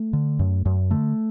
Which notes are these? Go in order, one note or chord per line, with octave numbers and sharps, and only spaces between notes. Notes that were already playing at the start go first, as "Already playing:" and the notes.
Already playing: A3
D3
F#2
F#2
D3 A3